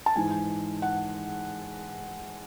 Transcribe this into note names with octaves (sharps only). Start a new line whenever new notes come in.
A5
G#2 E3 G#3 G#5
F#5